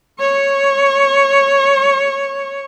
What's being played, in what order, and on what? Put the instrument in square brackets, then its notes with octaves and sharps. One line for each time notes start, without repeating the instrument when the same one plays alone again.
[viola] C#5 C#6